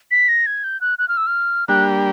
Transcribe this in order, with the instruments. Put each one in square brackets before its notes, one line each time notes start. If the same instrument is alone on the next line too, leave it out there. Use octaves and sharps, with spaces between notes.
[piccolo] B6
A#6
G#6
G6
F#6
F#6
F6
E6
F6
[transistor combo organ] G3 A#3 D4 G4 [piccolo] F#6